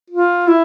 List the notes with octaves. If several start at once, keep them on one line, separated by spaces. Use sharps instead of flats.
F4
E4